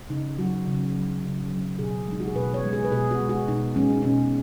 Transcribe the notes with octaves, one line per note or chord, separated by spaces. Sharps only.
C#3 D#4
F#3 F#4
C#3
F#3
C#3
F#3
B2 G#4
G#3 D#4
F#4
G#4
B2 B4
C#5
G#3
G#4
B4
B2 G#4
F#4
G#3
F#4
B2 D#4
G#3 C#4
D#4
B2 C#4